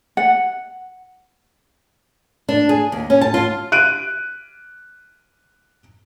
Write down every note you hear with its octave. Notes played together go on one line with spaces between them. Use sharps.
F#5
D4
G#4
D#2
C#4
A5
F4
F#6 D7 D#7